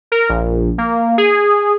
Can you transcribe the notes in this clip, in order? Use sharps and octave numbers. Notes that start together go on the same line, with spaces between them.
A#4
A#1
A#3
G#4